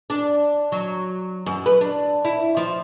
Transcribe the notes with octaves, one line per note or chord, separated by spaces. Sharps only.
D4
F#3
F#2
B4
D4
E4
F3